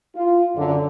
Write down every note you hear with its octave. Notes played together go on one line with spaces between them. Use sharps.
F4
F#2 D3